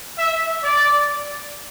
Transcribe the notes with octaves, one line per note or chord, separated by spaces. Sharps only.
E5
D5